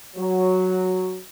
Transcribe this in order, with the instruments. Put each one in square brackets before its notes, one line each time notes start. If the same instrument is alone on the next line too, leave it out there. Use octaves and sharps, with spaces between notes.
[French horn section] F#3